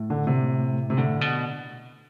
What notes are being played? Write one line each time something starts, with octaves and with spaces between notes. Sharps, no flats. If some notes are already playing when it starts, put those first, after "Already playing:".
Already playing: A2
D3
C3
C3
A2 D3
B2